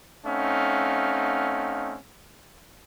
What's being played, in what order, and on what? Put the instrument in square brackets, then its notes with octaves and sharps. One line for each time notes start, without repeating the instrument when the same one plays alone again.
[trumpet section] A3 C4 C#4 D#4 F5 F#5